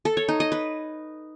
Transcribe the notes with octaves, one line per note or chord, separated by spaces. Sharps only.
A4
C#5
D#4
D#5
B4